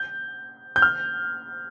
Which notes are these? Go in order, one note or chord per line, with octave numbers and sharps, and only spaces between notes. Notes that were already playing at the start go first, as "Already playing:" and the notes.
Already playing: G6
G6
F6